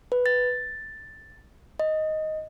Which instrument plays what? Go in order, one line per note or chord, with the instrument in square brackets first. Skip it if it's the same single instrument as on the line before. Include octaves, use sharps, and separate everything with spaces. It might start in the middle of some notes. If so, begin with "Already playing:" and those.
[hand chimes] B4
A6
D#5